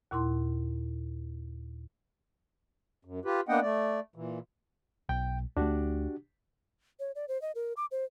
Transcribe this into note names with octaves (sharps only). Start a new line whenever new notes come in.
D#2 A#2 E4 C6
F#2
F4 G4 B4
A#3 B3 D4 D#5 F#5 G5
A3 D5
A#2 E3
B1 G5
D2 A3 D4 F#4 G4
C#5
D5
C5
D#5
A#4
D6
C5